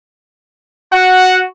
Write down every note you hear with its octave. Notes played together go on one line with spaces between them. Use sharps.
F#4 F#5